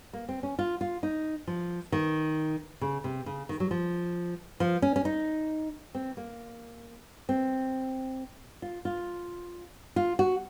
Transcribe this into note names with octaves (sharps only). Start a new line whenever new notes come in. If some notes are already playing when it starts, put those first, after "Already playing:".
A#3
C4
C#4
F4
F4
D#4
F3
D#3
C#3
C3
C#3
D#3
F#3
F3
F3
C#4
C#4
D#4
C4
A#3
C4
F4
F4
F4
F#4